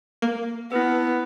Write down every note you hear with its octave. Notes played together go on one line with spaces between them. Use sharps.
A#3
B3 E4 B4